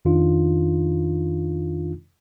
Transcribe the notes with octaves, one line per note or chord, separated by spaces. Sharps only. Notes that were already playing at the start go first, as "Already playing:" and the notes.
F2 D#3 D4 D#4 F4